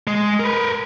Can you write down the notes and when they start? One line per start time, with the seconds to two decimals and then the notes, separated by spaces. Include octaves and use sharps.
0.07 G#3
0.40 A#4 B4